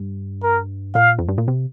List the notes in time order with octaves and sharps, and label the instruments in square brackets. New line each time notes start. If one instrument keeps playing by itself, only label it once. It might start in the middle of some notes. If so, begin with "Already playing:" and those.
Already playing: [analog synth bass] G2
[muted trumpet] A#4
[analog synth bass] A#2 [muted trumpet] F5
[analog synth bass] F2
G2
A#2
C3